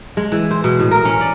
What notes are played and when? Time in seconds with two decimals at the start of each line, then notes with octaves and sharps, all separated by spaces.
0.17 G#3
0.32 E3
0.51 C5
0.64 B2
0.80 A2
0.91 A#4
1.05 C#4
1.21 D5